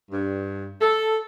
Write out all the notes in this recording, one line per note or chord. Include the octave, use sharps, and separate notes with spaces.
G2
A4